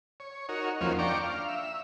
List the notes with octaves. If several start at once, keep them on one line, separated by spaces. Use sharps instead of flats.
C#5
D#4 F#4 A#4 C#5
F2 D#3 F3 F#3 A#3 C#4
D4 G5 A#5 C#6 D6
F5
E5